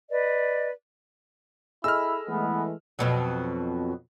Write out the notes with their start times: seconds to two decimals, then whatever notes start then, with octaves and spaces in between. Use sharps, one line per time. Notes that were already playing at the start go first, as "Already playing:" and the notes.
0.10 B4 D5 D#5
1.84 E4 G#4 A4 D#5 E6 F6
2.29 E3 G#3 A3 B3
2.99 F2 B2 F#3